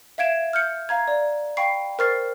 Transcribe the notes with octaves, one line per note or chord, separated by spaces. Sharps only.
E5 F5 G#6 D7 E7
F6 G6 C#7
F5 A#5 G#6
D5
F5 G5 B5 C#6 C7
A#4 C5 C#6 F6 A6 C7